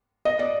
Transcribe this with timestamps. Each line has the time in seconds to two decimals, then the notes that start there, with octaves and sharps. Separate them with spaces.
0.25 D#5
0.39 D5